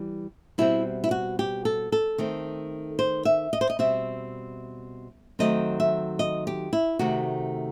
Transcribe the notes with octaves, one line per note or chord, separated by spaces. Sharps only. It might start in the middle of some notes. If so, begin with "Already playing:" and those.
Already playing: E3 G3
B2 G3 C4 E4
E4
F#4
G4
A4
A4
D#3 A3 C4
C5
E5
D#5
C5
D#5
B2 G3 C4 E5
D#3 F#3 A3 C4 D#5
E5
D#5
G4
E4
C3 D#3 A3 C4 F#4